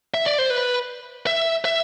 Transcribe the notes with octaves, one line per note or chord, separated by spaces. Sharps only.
E5
D5
C5
B4
E5
E5